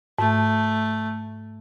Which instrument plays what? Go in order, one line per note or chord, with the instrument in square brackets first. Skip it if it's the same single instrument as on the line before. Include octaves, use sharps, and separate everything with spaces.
[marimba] G#2 [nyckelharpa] A3